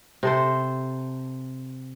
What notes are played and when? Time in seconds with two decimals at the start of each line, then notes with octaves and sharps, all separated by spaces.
0.23 C3 A4 C5